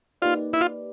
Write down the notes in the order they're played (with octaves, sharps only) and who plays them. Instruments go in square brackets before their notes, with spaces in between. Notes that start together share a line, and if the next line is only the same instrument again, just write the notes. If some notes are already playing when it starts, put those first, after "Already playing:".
[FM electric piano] A#3 D#4 G4 B4 D5 [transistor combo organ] F4
[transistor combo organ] E4
F4